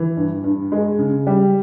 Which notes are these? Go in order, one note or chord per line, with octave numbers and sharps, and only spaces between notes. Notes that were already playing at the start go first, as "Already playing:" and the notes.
Already playing: E3
G2
G2
G#3
C#3
G3